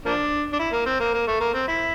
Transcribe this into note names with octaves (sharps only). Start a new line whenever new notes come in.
F3 A#3 D4
D4
E4
A#3
C4
A#3
A#3
A3
A#3
C4
E4